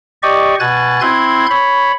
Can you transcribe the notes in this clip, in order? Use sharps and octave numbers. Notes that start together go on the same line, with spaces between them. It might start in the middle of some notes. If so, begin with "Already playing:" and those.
G4 D5 D#5 C#6
B2 G#5 F#6 A6
C4 E4 C6 F#6 G#6
C#5 B5